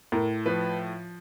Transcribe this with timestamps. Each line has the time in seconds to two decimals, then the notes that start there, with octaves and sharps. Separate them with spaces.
0.12 A2 A#4
0.46 F3 B4